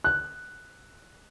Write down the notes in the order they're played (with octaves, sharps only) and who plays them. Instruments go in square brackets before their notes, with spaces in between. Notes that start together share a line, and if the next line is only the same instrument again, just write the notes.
[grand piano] F#6